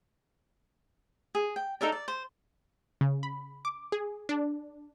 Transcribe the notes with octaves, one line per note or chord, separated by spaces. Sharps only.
G#4
G5
D#4 A4 A#4 D5
D5
C5
C#3
B5
D6
G#4
D4